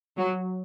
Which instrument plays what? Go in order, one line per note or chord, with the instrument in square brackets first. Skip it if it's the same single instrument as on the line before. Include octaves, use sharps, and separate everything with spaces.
[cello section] F#3